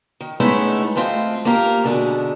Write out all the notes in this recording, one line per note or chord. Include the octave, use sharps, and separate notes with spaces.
D#3
G#3 A3 B3 C#4 D#4 E4
G#3 A3 C4 F4 D#5 G5
A#3 F4 G4 A#4
G#2 B2 D3 G#3